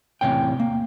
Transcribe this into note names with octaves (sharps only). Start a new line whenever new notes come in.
E2 A2 C3 C#4 G5
A#3